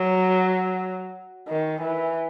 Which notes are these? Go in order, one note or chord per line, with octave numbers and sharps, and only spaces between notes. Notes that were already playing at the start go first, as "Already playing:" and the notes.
Already playing: F#3
D#3
E3